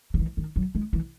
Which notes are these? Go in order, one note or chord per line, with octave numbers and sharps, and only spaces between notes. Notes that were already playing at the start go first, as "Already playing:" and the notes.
F#3
E3
D#3
F#3
G#3
E3